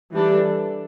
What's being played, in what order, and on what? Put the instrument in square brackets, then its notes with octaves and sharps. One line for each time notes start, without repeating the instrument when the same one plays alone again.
[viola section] E3 G3 D4 A4